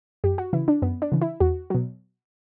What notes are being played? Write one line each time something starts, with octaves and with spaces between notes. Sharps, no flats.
F#2 G4
F#4
C#3 E3 E4
D4
F#2 B3
D4
C#3 E3
E4
E2 F#4
B2 F#3